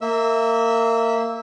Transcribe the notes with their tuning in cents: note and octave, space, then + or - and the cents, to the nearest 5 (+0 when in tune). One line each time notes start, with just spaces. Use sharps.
A#3 -20 E5 -20 E6 +0